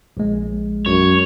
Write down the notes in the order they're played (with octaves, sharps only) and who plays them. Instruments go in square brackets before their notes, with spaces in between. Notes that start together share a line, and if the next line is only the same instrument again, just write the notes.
[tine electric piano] A#1 G#3
[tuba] F#2 [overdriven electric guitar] C#5